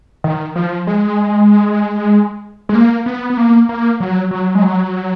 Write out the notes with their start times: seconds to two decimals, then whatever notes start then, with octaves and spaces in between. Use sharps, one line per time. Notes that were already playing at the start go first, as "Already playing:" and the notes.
0.24 D#3
0.56 F3
0.87 G#3
2.69 G#3
2.75 A#3
3.06 B3
3.30 B3
3.37 A#3
3.69 A#3
4.00 F#3
4.31 F#3
4.55 G#3
4.62 F#3